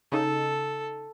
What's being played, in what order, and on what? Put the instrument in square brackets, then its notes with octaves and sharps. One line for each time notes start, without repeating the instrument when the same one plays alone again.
[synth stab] C#3 D#4 [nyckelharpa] A4